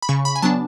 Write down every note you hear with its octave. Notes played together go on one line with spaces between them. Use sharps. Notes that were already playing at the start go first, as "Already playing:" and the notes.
B5
C#3 C#6
B5
G#5
F#3 B3 D4 A5